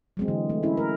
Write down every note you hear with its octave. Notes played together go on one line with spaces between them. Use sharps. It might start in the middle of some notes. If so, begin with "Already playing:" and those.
F#3 G#3 C4
D3 E3
A3
C#4 E4
A#4